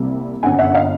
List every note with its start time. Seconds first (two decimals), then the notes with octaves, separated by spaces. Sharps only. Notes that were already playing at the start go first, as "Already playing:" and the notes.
Already playing: C2 C3 G3 A#3
0.43 G1 F#2 D3 F#5 G#5
0.58 E5 F#5
0.74 D#5 F5